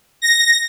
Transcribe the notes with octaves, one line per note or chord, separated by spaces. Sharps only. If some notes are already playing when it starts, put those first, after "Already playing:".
A#6